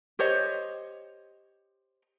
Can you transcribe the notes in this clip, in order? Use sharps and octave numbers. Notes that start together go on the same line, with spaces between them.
G4 C5 C#5 D#5